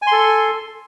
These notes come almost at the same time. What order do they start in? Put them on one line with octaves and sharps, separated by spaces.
G#5 C6 A4